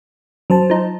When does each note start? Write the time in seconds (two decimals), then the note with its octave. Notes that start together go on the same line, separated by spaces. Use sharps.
0.50 F#2 F#3 C5 A5
0.70 F3 D#4